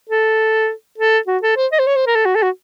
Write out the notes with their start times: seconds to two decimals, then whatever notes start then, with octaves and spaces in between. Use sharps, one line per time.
0.09 A4
0.98 A4
1.27 F#4
1.43 A4
1.56 C5
1.72 D#5
1.79 C5
1.87 C#5
1.96 C5
2.07 A#4
2.15 A4
2.26 F#4
2.35 A4
2.42 F#4